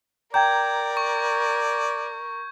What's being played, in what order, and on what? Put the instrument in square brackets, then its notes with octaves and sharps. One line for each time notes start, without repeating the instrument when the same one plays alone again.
[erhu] A#4 [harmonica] D5 [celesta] G5 A#5 [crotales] G6 G#6
[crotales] C#6